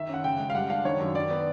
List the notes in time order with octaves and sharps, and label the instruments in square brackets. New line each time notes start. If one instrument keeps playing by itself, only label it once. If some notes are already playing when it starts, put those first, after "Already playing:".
Already playing: [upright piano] D#3 E5
C#4 F#5
C#3 G5
G#3
F5
G3 F#5
D4 F5
D#3 C#5
F#2
D#3 D5
B3